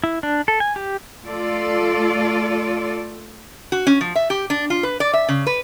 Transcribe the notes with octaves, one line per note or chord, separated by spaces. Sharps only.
E4
D4
A4
G#5
G4
A3 F4 A4 D5
F#4
C#4
F3
E5
G4
D4
F4
B4
D5
E5
C#3
B4